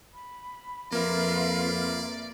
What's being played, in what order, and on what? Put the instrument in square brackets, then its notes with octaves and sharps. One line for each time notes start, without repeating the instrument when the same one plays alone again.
[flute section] B5
[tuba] F2 [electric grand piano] A#3 A#4 [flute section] F4 B4 E5 [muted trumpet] D5